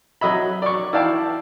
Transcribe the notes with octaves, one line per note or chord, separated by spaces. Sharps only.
F#3 D#5 E5 B5
D5 C#6
E4 D5 F5 G5 A5